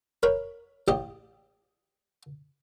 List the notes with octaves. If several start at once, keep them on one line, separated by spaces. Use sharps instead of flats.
A#4 C#5 B5
A1 G4 D#5